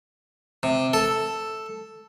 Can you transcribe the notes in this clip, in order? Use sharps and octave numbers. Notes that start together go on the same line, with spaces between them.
C3
A4